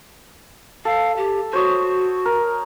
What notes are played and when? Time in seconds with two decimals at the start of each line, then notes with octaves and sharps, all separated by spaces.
0.85 A4 F5
1.17 G4
1.53 F#4 C5 C#5 D#6
2.25 A#4